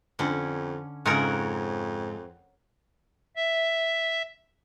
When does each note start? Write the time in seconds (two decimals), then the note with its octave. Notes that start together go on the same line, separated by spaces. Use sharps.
0.19 F2 D3 C#4
1.06 F2 G#2 C#3 A#4 C#5 F#5
3.36 E5